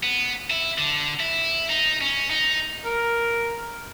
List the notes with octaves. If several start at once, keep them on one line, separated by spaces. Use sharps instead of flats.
B3
E4
D3
E4
D#4
C#4
D#4
A#4